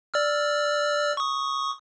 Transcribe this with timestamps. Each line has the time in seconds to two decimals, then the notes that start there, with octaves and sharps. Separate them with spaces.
0.14 D5 E6 F6
1.17 C#6 D#6